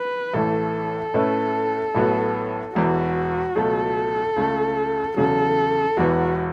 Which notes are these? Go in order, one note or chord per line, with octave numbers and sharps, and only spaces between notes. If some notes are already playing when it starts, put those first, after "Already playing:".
Already playing: B4
A1 A2 E3 A3 A4
A2 A3 C#4 E4 B4
A1 A2 F#3 B3 F#4
E1 E2 E3 F#4
C#2 B2 F#3 A3 A4
C#2 C#3 A3
E2 C#3 F#3 A4
E1 E2 E3 B3 F#4